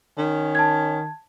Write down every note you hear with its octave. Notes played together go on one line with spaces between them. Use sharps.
D#3 C#4
A5 G#6